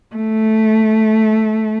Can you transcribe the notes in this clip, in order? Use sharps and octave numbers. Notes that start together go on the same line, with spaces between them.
A3